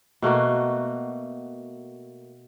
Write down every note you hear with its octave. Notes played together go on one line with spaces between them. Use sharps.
B2 A3 A#3 F#4